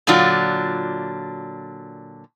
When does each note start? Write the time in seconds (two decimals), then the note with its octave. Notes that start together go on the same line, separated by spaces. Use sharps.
0.07 A#2 D3 F#3 D4 F4